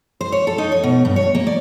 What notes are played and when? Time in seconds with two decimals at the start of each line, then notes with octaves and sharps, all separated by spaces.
0.21 C5
0.32 C#5
0.47 A4
0.58 D#4
0.72 C#5
0.83 B2
1.05 G2
1.16 C#5
1.35 A#3
1.47 D5